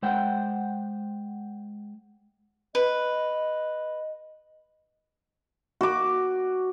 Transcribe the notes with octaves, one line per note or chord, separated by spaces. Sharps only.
G#3 C5 F#5 G5
B4 D#5
F#4 D6